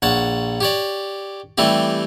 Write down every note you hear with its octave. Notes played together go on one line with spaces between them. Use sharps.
A#1 C#5 F#5 A5
G4 C#5 D5
E3 G3 A3 C4 G4